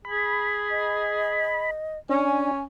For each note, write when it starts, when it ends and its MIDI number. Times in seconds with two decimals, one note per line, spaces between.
0.05 1.79 68
0.05 1.71 83
0.70 1.98 75
2.09 2.64 61
2.09 2.51 62
2.09 2.63 80